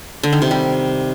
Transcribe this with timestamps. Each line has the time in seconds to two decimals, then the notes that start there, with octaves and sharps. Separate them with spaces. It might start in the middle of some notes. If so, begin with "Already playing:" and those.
0.23 D3
0.33 D#3
0.42 C3
0.51 G3